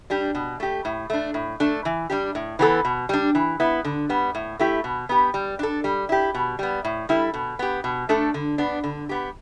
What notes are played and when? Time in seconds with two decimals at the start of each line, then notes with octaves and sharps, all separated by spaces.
0.10 G3 D4 G4
0.35 B2
0.60 A3 G4
0.85 A2
1.10 A3 D4
1.34 A2
1.60 A3 D4 A4
1.85 E3
2.10 G3 D4 G4
2.35 A2
2.59 E3 B3 D4 A4
2.85 B2
3.09 G3 D4
3.35 E3
3.60 B3 E4
3.85 D3
4.09 G3 B3
4.35 A2
4.59 A3 E4 G4
4.84 B2
5.09 B3 G4
5.34 G3
5.59 D4 A4
5.84 G3
6.09 E4 G4
6.34 B2
6.59 G3 B3
6.85 A2
7.09 G3 E4 A4
7.34 B2
7.59 B3 G4
7.84 B2
8.09 A3 D4 A4
8.34 D3
8.58 B3 D4
8.84 D3
9.09 B3 G4